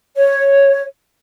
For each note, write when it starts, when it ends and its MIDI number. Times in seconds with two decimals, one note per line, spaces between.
0.16 0.82 73